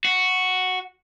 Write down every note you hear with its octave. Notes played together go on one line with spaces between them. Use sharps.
F#4